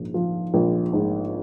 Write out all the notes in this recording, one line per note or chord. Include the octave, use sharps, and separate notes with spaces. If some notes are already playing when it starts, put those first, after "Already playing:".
Already playing: A#1 G#2
F3
A#1
G#2